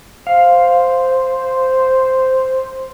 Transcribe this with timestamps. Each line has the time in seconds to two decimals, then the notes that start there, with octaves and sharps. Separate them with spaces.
0.27 C5 F5